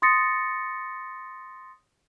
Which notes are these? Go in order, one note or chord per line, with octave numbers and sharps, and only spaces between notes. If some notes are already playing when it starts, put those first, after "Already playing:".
C6 D#6 A6 A#6 C#7